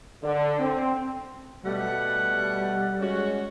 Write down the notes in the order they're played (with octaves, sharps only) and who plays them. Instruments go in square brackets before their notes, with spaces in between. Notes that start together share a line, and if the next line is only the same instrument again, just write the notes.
[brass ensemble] D3
C4
[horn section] B2 A3 F#5 [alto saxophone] G3
[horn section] G#3 C#4 F#4